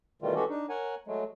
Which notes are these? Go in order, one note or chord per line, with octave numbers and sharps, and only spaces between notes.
B2 D#3 E3 G3 A3 F4
E3 G#3 C#4 F#4 G4 A4
D4 D#4
A#4 C#5 F#5 G#5
F#3 G#3 A3